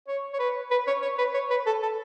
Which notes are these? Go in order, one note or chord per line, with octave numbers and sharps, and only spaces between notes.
C#5
C#5
B4
B4
C#5
C#5
B4
C#5
B4
A4
A4